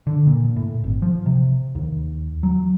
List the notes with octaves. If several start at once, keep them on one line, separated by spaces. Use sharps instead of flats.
D3
A#2
A2
G#1
F3
C3
D#2
F#3